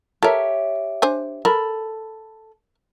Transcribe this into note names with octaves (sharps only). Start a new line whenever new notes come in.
G4 A4 A#4 C#5 E5
D4 C5 G#5
A4 A#4 B5